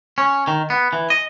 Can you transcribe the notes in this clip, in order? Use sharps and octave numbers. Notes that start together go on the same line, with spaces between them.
C#4
D#3
B3
E3
D#5